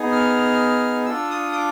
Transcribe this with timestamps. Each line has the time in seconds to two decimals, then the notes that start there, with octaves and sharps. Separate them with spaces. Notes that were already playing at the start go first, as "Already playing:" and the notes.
Already playing: B3 D#4 G#4
0.12 F6
1.06 D4 F4 A4 E6
1.30 D#6
1.52 D#6
1.56 D6